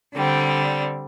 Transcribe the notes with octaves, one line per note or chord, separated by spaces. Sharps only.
D3 G3 C4